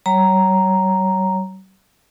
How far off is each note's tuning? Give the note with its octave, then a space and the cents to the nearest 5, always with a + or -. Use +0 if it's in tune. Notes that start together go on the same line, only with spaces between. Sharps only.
G3 -45 C#5 +0 A#5 +0